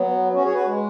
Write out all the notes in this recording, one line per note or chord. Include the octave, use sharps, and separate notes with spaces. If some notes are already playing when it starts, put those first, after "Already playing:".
Already playing: F#3 B3
C#4 F#4
G#4 C#5
F#4 B4
G#3